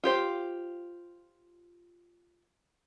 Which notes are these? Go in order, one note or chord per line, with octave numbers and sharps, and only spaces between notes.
F4 G4 C5